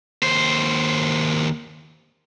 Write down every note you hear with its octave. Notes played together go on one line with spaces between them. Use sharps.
D#2 C5